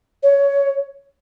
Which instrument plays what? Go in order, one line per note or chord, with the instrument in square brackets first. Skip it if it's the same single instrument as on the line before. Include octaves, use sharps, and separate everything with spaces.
[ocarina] C#5